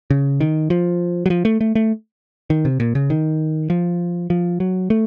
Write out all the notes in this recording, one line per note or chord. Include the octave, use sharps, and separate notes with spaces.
C#3
D#3
F3
F#3
F3
A3
A3
A3
D#3
C3
A#2
C#3
D#3
F3
F3
F#3
A3